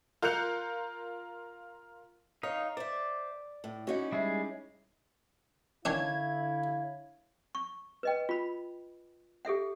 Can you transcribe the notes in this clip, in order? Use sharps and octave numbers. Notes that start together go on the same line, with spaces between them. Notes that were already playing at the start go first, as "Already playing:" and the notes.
F4 A#4 F#6 G6 C#7 F7
D#4 C#5 D#5 F5
C5 D5 E5
A2
C#4 D#4 E4 F#4 F#5
G3 G#3 G#4 E5
D3 D#3 C#4 D4 E4 C#5 F5 G#6
C#6
B4 D#5 G5
F4 B5
G4 A4 E5 F#5